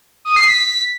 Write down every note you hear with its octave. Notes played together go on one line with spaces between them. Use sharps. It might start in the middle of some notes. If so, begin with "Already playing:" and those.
D#6
C7
B6